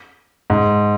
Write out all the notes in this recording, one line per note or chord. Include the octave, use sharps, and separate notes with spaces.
G#2